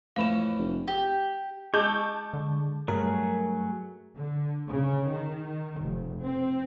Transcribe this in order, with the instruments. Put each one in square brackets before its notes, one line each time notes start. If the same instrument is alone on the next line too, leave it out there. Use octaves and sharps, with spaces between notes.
[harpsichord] F2 E3 C#4 [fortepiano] A2 [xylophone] F5 B5 E7
[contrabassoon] F1
[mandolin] G4
[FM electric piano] G#3 [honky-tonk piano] A5 D6 G6 [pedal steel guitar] C#6 E6
[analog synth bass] D3
[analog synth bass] G2 [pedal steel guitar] F#3 A3 G#4 [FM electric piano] A#4
[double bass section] D3
C#3
D#3
F1
C4